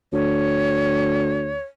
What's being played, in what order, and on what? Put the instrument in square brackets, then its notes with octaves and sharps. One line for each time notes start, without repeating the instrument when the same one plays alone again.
[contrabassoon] D2 [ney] C#5